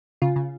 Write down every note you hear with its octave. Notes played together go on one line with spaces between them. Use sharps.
C#3 F4
C#3